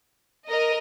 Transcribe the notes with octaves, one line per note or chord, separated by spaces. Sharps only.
A#4 D#5